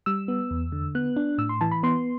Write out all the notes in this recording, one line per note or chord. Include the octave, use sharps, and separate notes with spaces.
G3 E6
B3
E2
D3
B3 F#6
D4
A2 E6
C6
E3 A5
B5
B3 C6